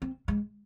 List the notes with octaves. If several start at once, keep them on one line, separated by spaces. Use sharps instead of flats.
C4
G#3